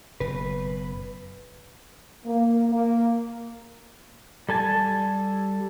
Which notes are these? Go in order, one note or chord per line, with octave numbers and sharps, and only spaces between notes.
F#1 B2 B4
A#3
A#3
G3 A4 G#5 A5